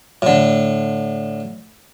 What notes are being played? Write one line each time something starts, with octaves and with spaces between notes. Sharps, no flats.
A2 D3